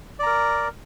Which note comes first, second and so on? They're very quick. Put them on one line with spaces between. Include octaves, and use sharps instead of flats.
D5 A#5 A#4